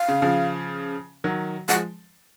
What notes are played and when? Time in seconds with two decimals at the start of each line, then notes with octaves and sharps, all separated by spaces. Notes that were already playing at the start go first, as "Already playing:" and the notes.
Already playing: F5
0.08 C#3
0.22 C#3 F3
1.24 D#3 F#3
1.68 F3 G#3 F#5